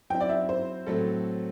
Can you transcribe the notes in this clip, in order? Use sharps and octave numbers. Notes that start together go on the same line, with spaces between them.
F#3 C4 E4 G5
D5
E5
C5
A2 F#3 A3 C4 A4